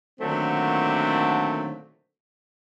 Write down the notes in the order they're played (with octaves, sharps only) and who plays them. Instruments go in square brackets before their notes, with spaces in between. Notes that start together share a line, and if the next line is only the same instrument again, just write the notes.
[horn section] A#2 D3 D#3 F#3 A3 C4